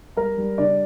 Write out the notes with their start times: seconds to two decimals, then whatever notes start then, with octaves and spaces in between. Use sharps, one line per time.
0.17 G3 A#4 A#5
0.38 G3
0.58 C#3 D4 D5